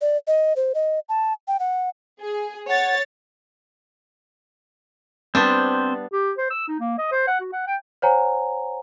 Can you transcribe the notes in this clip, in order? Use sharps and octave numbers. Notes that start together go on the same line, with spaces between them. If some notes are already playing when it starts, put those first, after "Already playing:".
D5
D#5
C5
D#5
A5
G5
F#5
G#4
C#5 F#5 A6
G3 B3 C4 D4 C5
G4
C5
E6
D#4
A#3
D#5
C5
F#5
F#4
F#5
G5
C5 C#5 F#5 G#5 A#5